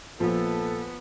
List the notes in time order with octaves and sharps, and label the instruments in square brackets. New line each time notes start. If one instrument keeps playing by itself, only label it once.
[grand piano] A#1 [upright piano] F3 [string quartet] B3 [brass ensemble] A4